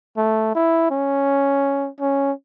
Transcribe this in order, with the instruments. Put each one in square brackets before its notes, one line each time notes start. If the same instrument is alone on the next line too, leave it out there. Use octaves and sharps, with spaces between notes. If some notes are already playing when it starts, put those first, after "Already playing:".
[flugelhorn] A3
E4
C#4
C#4